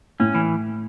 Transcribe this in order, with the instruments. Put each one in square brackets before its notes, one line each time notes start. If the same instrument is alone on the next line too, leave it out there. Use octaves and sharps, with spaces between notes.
[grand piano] A2 [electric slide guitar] C#4
[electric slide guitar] E3